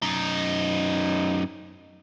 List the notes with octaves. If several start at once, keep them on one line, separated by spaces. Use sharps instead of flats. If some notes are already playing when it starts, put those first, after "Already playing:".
F#2 D#4